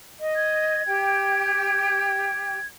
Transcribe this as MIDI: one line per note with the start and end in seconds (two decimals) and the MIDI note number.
0.19 0.81 75
0.36 2.65 92
0.86 2.58 67
0.86 2.58 79